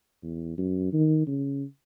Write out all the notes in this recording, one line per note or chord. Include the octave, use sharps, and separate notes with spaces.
E2
F#2
D#3
C#3